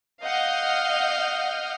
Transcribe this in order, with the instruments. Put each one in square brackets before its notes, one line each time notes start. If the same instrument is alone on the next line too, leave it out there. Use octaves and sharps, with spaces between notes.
[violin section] D#5 F5 F#5 D#6 F6 G6